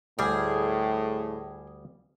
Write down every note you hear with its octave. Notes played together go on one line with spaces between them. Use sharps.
D2 A2 G3 G#4